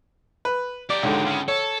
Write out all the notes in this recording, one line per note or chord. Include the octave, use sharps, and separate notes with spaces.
B4
G4 A#4 D5
C#2 G#2 D3
C#3
A4 C#5